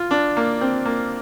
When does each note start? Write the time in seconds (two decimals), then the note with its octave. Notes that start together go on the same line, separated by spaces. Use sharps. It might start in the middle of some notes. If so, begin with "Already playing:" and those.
Already playing: F4
0.11 D4
0.37 A#3
0.61 C4
0.86 A#3